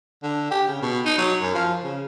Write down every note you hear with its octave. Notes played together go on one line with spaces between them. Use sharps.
D3
G4
C#3
B2
D#4
F#3
F#2
F3
C#3